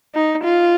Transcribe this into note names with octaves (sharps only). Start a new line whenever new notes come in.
D#4
F4